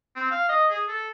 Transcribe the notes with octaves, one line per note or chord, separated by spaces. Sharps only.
C4
F5
D#5
G#4
A4